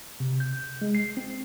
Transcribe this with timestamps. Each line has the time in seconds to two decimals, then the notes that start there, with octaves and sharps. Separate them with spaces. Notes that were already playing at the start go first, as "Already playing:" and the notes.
0.20 C3
0.40 G6
0.82 G#3
0.95 C7
1.17 C4